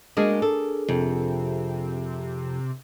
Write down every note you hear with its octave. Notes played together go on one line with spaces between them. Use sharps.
G#3 A#3 D4 F#4 G#4 A#4
A4
F2 C3